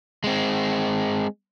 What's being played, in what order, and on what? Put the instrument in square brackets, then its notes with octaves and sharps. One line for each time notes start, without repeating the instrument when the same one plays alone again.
[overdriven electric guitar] G#3 C4